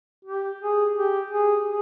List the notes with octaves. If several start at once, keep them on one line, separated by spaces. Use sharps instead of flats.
G4
G#4
G4
G#4
G#4